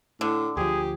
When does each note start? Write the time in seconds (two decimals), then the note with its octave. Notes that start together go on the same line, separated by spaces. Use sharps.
0.21 A2 D3
0.57 D2 F3 G4 G#4